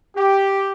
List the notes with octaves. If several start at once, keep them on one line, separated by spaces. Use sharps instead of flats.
G4